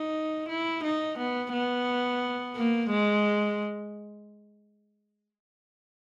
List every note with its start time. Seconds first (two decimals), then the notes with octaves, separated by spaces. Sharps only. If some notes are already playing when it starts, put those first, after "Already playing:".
Already playing: D#4
0.48 E4
0.83 D#4
1.17 B3
1.53 B3
2.56 A#3
2.90 G#3